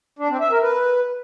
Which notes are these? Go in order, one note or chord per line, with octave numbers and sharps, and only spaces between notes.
D4
C4
E5
A#4
B4